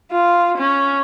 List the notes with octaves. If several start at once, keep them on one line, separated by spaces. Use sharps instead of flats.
F4
C#4